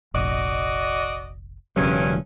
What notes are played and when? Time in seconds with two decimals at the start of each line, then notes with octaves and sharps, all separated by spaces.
0.14 F1 A#1 F#4 D5 D#5
1.76 E1 D2 G2 C#3 F#3 C#4